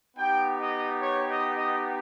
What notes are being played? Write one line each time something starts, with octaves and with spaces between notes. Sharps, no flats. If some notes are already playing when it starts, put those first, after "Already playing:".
B3 D#4 G4 G5
D#5
C#5
D#5
D#5